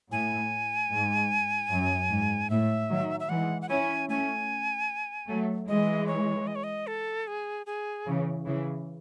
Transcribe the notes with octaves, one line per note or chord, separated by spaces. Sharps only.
A2 G#5
G#2
F#2
G#2
A2 E5
D#3 F#3
E5
E3 G#3 F#5
F#5
C#4 E4 G#5
A3 C#4 G#5
F#3 A3
E3 G#3 D#5
C#5
D#5
C#5
D#5
A4
G#4
G#4
C#3 E3
C#3 E3